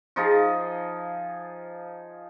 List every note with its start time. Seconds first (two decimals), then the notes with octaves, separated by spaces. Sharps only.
0.16 F3 D#4 F4 G#4